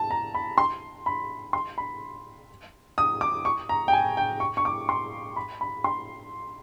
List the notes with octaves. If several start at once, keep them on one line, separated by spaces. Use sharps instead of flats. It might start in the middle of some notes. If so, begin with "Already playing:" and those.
Already playing: A5
A#5
B5
C6
B5
C6
B5
D#6
D6
C#6
A#5
G5
G#5
G5
C#6
C#6
D6
C6
B5
B5
C6